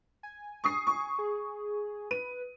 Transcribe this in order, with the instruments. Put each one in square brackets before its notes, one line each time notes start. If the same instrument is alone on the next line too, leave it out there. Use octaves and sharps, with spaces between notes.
[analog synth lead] G#5
[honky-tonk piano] C#6 D#6 C7
C#6
[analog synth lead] G#4
[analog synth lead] B4 [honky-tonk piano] D#7